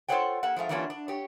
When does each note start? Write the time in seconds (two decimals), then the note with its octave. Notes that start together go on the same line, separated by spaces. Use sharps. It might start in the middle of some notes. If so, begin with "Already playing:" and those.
0.08 F4 A4 C5 C#5 F#5 G5
0.43 A#3 G4 F#5
0.56 F3 G#3 A3 F5
0.69 E3 G3 A#3 C#4 D4 F4
0.90 D4
1.08 G4 C#5